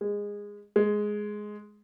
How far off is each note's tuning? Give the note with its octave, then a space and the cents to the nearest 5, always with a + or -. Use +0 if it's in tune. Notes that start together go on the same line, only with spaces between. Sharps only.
G#3 -20
G#3 +5